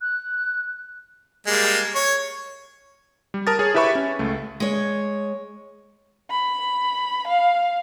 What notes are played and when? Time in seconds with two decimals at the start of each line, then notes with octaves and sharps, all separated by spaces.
0.01 F#6
1.47 G3 G#3 A#3
1.95 C#5
3.34 G3
3.47 A#4 A5 D#6 A6
3.59 G#4 C#5
3.74 E4 G4 B4 E5 B5 C#6
3.95 C#4
4.19 C#2 A3
4.60 G#3 C#5
6.31 B5
7.28 F5